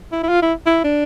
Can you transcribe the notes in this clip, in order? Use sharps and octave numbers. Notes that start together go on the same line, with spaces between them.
E4
E4
F4
E4
E4
D4